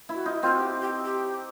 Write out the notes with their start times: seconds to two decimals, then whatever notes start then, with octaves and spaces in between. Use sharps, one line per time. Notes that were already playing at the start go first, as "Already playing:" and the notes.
0.09 E4
0.14 F#4
0.26 D#4 F4
0.35 E4
0.43 C4 F4
0.52 F#4
0.59 G4
0.81 G4
1.05 G4